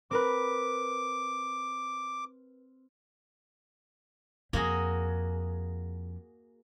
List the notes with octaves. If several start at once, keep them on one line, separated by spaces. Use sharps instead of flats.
C4 A#4 B4 D6
F2 A#3 F#4 G#4